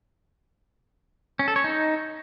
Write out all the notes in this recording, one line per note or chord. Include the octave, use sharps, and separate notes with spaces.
C#4
A4
C#5
D#4